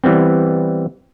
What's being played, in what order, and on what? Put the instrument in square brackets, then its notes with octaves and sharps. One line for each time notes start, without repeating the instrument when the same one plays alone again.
[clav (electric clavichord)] E3 G3 B3 C4